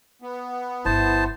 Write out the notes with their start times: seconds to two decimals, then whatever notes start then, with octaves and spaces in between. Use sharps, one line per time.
0.22 B3
0.85 G1 E4 C5 A5